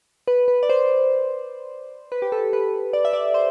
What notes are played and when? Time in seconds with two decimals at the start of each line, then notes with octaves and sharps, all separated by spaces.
0.28 B4
0.48 B4
0.63 D5
0.70 C5
2.12 B4
2.22 G4
2.32 A4
2.53 B4
2.93 D5
3.05 E5
3.13 D5
3.34 C5